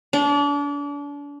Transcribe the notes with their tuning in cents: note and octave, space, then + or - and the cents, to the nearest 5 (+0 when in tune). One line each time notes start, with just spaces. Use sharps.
D4 -35